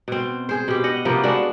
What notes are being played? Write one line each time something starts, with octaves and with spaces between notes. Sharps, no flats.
B2 C4
G#4 C5
B2 G4
D#5 F#5
C3 F3 A#3 B3
G#3 B3 D4 F#4